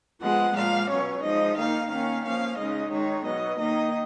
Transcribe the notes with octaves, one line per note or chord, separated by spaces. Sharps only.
F3 G#3 B3 F#5
A#2 F3 G#3 F5
B2 F#3 C#4 C#5
F3 G#3 D#4 D#5
D#3 A#3 D#4 F5
D#3 A#3 C#4 F5
F3 A#3 C#4 F5
C#3 G#3 D#4 D#5
D#3 G#3 D#4 C#5
B2 F#3 B3 D#5
D#3 A#3 D#4 D#5